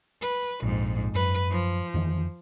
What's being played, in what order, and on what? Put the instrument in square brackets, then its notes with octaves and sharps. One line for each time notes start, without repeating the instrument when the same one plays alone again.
[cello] B4
[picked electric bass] A#1 [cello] F2 G#2
[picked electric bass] F#2 [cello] B4
[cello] F3
[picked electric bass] F2 D#3 E3